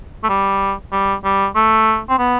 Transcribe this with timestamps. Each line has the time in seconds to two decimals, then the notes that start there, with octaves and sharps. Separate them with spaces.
0.24 A3
0.29 G3
0.92 G3
1.24 G3
1.55 A3
2.09 C4
2.18 B3